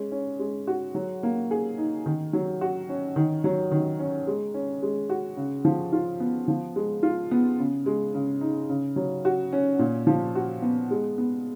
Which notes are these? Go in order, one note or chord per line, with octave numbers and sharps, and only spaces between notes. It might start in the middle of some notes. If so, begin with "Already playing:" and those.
Already playing: G#3 C#4
C#4
G#3
F#4
F#3
A#3
G#4
D#4
D#3
F#3
F#4
C#4
D#3
F#3
D#3
C#4
G#3
C#4
G#3
F#4
C#3
F3
F4
B3
F3
G#3
F4
B3
C#3
G#3
C#3
D#4
C#3
F#3
F#4
C#4
A#2
F3
F#4
B3
G#3
B3